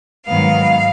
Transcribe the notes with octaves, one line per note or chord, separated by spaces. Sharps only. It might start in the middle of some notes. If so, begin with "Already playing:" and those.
G#2 D#3 F#3 B3 F5